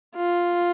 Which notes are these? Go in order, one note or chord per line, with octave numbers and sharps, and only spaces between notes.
F4